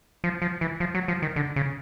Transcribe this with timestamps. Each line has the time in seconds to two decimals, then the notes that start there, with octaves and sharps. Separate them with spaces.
0.24 F3
0.42 F3
0.61 E3
0.80 F3
0.95 F#3
1.08 F3
1.22 D#3
1.36 D3
1.56 C#3